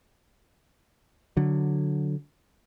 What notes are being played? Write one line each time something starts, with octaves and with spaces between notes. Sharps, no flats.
D3 F#3